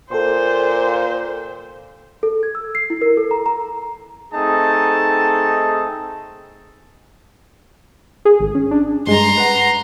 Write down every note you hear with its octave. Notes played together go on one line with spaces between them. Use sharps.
A#2 A4 C5 G5 C6
A4
G#6
E6
C7
E4
A#4
A4
A#5
A#5
A3 C4 D#4 G#4 A4 A5
G#4
G#1
C#4
D4
G2 G#3 A#5 C6
B4 F#5